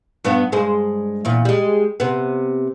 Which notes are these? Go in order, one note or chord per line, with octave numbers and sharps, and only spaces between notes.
G2 B3 D4
G2 G#3 C5
E2 A#2
G3 G#3
C3 B3